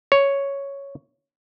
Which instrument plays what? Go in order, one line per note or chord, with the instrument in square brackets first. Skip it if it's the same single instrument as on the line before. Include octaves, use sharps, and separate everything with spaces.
[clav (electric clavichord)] C#5